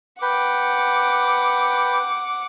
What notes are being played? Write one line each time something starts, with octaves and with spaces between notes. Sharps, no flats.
B4 F#5 G5 D6